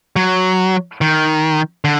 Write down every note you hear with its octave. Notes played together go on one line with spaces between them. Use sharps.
F#3
D#3
D3